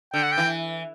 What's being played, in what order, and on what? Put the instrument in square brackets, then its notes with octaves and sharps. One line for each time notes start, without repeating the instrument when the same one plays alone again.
[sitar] D3 [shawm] G5
[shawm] F#5
G5
[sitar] E3